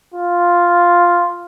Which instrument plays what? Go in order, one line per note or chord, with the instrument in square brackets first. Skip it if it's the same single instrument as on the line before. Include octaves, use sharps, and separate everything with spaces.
[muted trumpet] F4